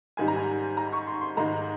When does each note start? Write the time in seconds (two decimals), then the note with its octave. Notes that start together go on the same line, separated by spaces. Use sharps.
0.17 G#2 D#3 G3 G#5
0.28 A#5
0.36 G#5
0.77 A#5
0.93 C#6
1.07 C6
1.21 C6
1.37 G#2 D#3 G#3 A#5